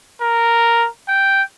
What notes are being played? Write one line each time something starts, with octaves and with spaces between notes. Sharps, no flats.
A#4
G5